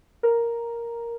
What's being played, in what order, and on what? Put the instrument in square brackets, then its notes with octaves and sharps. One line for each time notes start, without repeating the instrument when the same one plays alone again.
[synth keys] A#4